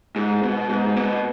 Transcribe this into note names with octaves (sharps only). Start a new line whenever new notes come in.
G#2
B2
G#2
B2